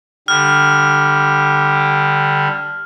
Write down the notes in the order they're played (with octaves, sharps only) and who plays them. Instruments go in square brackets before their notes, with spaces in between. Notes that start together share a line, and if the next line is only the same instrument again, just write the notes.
[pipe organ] D3 G3 [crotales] F6